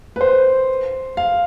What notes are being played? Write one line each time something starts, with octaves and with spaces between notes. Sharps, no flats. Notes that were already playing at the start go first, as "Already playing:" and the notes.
B4
C5
F5